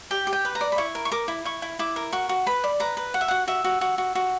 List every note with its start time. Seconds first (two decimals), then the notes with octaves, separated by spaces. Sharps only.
0.11 G4 G5
0.27 G4
0.33 G5
0.45 B4
0.55 A#5
0.61 D5
0.72 B5
0.78 E4 C#6
0.95 A#4
1.05 C#6
1.12 A#4 D6
1.28 E4
1.45 E4 C#6
1.62 E4
1.79 E4 D6
1.96 A#4
2.12 F#4 C#6
2.29 F#4
2.46 B4 B5
2.64 D5
2.80 B4 A#5
2.97 B4
3.14 F#4 F#5
3.21 E5
3.28 F#4 F#5
3.47 F#4 E5
3.64 F#4
3.81 F#4
3.98 F#4
4.15 F#4